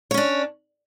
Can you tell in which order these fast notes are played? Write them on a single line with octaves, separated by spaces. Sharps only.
C#5 C#4 D4